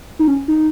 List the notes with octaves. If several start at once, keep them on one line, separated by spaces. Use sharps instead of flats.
D#4
C#4
D#4